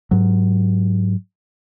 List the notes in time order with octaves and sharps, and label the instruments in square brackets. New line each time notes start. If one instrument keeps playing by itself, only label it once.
[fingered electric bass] G#2 F#3